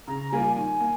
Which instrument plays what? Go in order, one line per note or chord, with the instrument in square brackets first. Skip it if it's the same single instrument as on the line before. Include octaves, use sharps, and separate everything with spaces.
[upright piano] C#3 [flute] A#5
[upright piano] G3 A#3 F4 A#4 [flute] G#5
[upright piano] D#3 [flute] G#5
[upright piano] A#3